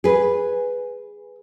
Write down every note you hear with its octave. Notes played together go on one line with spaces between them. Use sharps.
G#4 B4